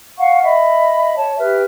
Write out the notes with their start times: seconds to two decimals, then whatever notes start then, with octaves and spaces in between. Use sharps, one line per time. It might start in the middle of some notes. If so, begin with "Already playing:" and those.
0.18 F5 F#5 C#6
0.43 D#5 E5 B5
1.16 C#5 A5
1.39 G4 B4 E5 F6